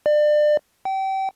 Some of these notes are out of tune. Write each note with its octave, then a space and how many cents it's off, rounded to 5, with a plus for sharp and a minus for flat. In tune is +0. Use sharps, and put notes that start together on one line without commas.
D5 +30
G5 -30